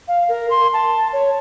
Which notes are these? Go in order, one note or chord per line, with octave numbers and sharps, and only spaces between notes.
F5
A#4
C6
A5
C#5